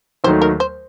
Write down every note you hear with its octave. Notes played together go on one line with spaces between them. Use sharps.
D#2 D#3 F#3 A3 D#4 C5
A#4
C5